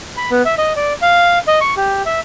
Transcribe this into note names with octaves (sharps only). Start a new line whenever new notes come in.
B5
B3
E5
D#5
D5
F5
D#5
C#6
G4
E5